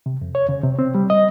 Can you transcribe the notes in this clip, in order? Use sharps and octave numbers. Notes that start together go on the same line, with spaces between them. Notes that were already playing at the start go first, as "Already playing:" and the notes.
C3
F2
C#5
C#3
C3
C4
G3
D#5